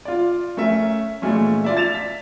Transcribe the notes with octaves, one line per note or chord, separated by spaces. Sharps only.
F4 D5
A3 C#4 A#4 E5
A#2 E3 G#3 A3 C#4
F4 D5 E5
A6 E7 F7
B6